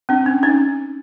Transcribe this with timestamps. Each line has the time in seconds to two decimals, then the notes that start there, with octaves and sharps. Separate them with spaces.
0.09 C4 D4
0.26 C#4
0.43 C#4 D#4